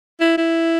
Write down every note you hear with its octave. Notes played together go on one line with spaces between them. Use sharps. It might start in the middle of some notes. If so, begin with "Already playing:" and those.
E4
E4